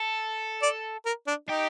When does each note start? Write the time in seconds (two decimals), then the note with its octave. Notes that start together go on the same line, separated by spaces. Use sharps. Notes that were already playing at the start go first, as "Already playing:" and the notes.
Already playing: A4
0.62 D5
1.05 A#4
1.27 D4
1.49 D#4 G4